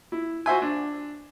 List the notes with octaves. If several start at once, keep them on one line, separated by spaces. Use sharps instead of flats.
E4
F#4 C5 E5 G#5
D4